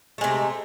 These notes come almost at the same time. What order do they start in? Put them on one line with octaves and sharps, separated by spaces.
A3 G#3 C3